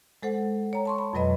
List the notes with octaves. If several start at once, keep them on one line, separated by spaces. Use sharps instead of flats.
G#3 A4 C5 F#5
C#5 G5 A#5
A5 C6 C#6
B5
F2 B2 F#3 B4 D#5 B5